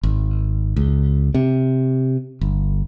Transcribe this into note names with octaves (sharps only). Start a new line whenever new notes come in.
G#1
C#2
C3
G1